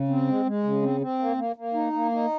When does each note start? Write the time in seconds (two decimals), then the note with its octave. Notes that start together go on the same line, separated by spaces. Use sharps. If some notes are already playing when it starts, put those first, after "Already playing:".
Already playing: C#3
0.08 C4
0.27 G#3
0.45 G#3
0.63 C#3
0.82 C4
1.01 C4
1.19 A#3
1.37 A#3
1.56 A#3
1.74 D#4
1.93 A#3
2.12 D#4